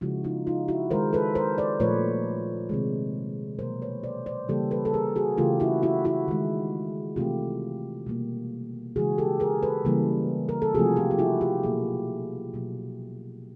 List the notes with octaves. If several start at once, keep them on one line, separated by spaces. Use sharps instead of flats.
C#3 F3 G#3 E4 F#4
D#4 F4
D#4 F4
E4 F#4
D#3 G#3 A#4 C5
A4 B4
A#4 C5
C5 D5
A#2 F3 A3 B4 C#5
C3 D#3 G#3
B2 F#3 A#3 A#4 C5
B4 C#5
C5 D5
C5 D5
C#3 E3 G3 A#3 G4 A4
A4 B4
A4
G#4 A#4
F#4 G#4
C#3 E3 A3 F4 G4
E4 F#4
E4 F#4
E4 F#4
D#3 G#3
C3 E3 A3 F4 G4
B2 G3 A#3
C#3 E3 G#3 F#4 G#4
G4 A4
G#4 A#4
A4 B4
C#3 E3 G3 A#3
A#4
A4
C3 F3 A3 F#4 G#4
F4 G4
G4
E4 F#4
F4 G4
B2 F#3 A#3 F#4 G#4
B2 F#3 A#3